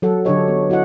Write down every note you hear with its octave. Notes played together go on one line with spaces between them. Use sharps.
F#3 A4 F#5
D3 F#3 D4 G4 C#5 D#5
B3
E4 F#4 D#5 F#5